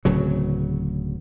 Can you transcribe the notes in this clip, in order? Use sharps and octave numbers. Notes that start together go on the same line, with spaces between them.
D1 C#3 F#3